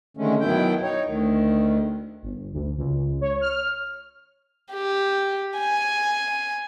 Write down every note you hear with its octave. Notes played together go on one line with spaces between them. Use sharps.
D3 D#3 G#3 A3 C#4
F#2 B2 D#3 E4 G5
D#4 C#5
D2 D#3
G1
D2
C#2
C#5
F6
G4
G#5